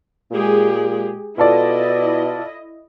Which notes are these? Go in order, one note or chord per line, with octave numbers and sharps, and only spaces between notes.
A#2 G#3 G4 G#4
B2 E4 F4 A4 D5 D#5